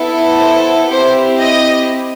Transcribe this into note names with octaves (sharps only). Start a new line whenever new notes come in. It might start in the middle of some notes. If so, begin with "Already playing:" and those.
Already playing: B3 E4 A4
C5
C4 E4 G4 C5
D#5